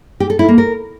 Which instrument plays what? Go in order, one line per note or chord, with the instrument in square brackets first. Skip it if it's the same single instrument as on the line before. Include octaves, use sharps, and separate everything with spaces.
[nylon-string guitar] G4
A4
E4
A#3
A#4